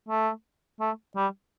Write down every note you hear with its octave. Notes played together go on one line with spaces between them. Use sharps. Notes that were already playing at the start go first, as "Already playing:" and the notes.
A3
A3
G3